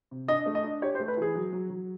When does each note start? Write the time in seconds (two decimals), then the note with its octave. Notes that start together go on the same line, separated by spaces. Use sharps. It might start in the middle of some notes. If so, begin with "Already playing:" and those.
0.11 C3
0.28 D4 D#5
0.46 A3
0.55 D#5
0.64 D4
0.82 G4 C#5
0.95 C5
1.00 A3
1.08 B4
1.17 E3 G#4
1.35 F#3
1.53 F#3
1.70 F#3